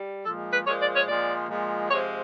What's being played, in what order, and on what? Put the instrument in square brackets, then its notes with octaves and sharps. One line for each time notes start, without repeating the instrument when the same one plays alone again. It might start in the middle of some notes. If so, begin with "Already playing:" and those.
Already playing: [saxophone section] G3
A#2 F3 G#3 A4
B4
A#2 F3 G#3 C#5
D5
C#5
A#2 F3 G#3 D5
A#2 F3 G#3
C3 F3 G#3 C#5